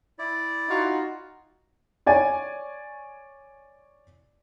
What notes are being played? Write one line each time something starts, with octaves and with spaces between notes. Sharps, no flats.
E4 D5
D#4 F4 F#4
C#5 D5 G#5